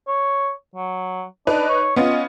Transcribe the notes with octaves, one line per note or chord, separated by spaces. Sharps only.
C#5
F#3
D4 D#4 B4
C#5
B3 C#4 F4 D#5